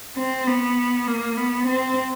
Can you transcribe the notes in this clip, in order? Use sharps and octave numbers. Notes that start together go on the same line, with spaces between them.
C4
B3
A#3
B3
C4